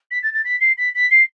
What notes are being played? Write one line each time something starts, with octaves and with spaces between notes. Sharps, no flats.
B6
A6
A6
B6
C7
B6
B6
C7